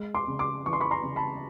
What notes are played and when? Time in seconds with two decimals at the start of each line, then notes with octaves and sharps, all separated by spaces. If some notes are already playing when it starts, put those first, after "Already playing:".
Already playing: G#3
0.15 C6 D6
0.28 C#3
0.39 C6 D6
0.66 E3 C#6
0.73 C6
0.80 B5 C#6
0.91 A#5 C6
1.03 C#3
1.16 A5 B5